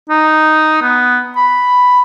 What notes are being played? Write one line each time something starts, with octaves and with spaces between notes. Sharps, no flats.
D#4
B3
B5